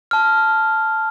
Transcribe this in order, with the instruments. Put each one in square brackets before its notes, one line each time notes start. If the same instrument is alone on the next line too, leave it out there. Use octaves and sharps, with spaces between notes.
[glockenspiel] A5 F6